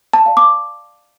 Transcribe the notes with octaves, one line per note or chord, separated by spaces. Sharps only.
A5
D5 F5
D6